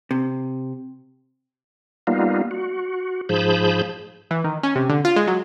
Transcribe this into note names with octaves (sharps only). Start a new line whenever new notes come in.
C3
G3 A#3 B3 D#4 F4
F#4
G#2 F3 G#4 A5 B5 G6
E3
D#3
C#4
C3
D3
F4
G#3
F#3